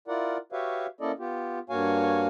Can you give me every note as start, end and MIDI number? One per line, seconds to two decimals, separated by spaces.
0.08 0.37 64
0.08 0.37 65
0.08 0.37 70
0.08 0.37 74
0.08 0.37 78
0.52 0.86 66
0.52 0.86 67
0.52 0.86 71
0.52 0.86 73
0.52 0.86 76
0.52 0.86 77
1.01 1.12 58
1.01 1.12 61
1.01 1.12 64
1.01 1.12 69
1.01 1.12 74
1.01 1.12 75
1.19 1.59 59
1.19 1.59 65
1.19 1.59 67
1.70 2.27 43
1.70 2.27 58
1.70 2.27 66
1.70 2.27 73
1.70 2.27 77
1.70 2.27 80